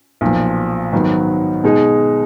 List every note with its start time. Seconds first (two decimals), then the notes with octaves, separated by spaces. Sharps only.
0.21 B1 A#2 F3
0.92 G#2 D#3 F#3 B3
1.64 B2 G#3 D#4 G#4